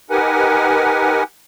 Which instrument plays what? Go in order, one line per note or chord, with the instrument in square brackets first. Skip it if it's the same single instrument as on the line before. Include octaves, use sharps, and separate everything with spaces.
[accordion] D#4 G4 A#4 B4 F#5 G#5